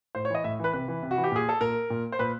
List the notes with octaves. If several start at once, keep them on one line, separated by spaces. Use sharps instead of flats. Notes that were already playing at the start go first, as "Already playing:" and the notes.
A2 C5
C#5
E3 D#5
A2 E5
E3 B4
C3 B4
E3
C3
F#4
E3
G4
A#2 G#4
A4
A#2 A#4
A#2
C5
A#2 B4